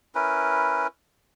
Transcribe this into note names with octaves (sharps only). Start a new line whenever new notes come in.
C#4 E4 A#4 B4